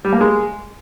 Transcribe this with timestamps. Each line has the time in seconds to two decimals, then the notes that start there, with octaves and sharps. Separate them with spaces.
0.05 G3
0.13 A#3
0.21 G#3